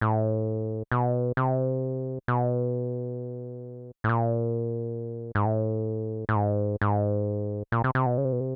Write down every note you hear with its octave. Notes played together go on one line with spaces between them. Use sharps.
A2
B2
C3
B2
A2
A#2
G#2
A2
A2
G#2
G#2
A#2
C3
C3
B2
C#3
C3
B2
C3